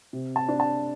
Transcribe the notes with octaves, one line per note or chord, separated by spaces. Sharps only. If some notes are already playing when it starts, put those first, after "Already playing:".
C3
A5
D4
A5